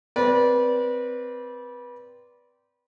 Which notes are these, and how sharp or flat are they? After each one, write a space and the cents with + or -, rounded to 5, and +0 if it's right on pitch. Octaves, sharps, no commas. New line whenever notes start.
C4 -15 B4 -25 D5 -15